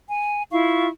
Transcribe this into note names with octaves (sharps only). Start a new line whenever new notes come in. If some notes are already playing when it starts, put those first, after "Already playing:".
G#5
E4 F4 F5 C#6